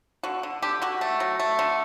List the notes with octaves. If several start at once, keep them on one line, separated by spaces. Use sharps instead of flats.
D3 F#4
D3
D3 G4
D3 F#4
A3
F#3
A3
D3